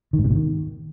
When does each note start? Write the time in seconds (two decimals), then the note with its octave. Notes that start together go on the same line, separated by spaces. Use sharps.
0.13 D#3
0.19 G#2
0.24 C3
0.30 B2
0.35 D#3